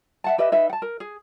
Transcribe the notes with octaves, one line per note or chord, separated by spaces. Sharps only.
E5 F#5 A5
G4 B4 D#5 E5
D#4 B4 E5
F#5 A5
A#4
G#4